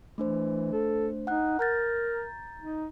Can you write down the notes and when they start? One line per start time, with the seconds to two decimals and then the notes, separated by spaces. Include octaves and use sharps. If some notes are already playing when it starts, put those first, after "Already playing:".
0.18 E3 A3 D4 C5
0.72 A4
1.27 D#4 F#5 F#6
1.59 A#4 A#5 G6 A6
2.60 D#4